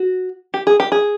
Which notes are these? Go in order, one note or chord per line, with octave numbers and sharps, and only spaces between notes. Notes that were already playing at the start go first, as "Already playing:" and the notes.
Already playing: F#4
G4
G#4
G4
G#4